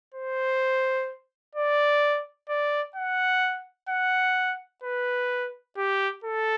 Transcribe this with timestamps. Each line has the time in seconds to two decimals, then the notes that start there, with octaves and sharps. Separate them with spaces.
0.14 C5
1.55 D5
2.49 D5
2.96 F#5
3.89 F#5
4.83 B4
5.77 G4
6.24 A4